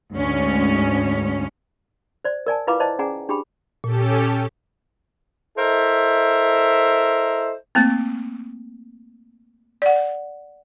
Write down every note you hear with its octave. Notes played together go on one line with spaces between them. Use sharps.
D2 G#2 C#4
C5 D5
A#4 D5 G#5 A5
E4 F4 B4 F5 A#5 D6
C5 D5 D#5 A5
C#4 G#4 D5 F#5 G#5 A#5
D4 G4 G#4 G5 B5
A#2 C#4 G4 A4
E4 A4 A#4 C5 D#5 E5
A3 A#3 C4
D5 F#5